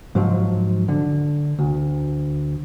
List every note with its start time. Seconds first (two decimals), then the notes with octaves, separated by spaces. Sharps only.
0.15 G#2 F3 F#3
0.88 D3
1.59 D2